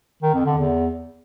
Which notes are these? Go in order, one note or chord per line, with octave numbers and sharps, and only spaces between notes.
D#3
F2
D3
E2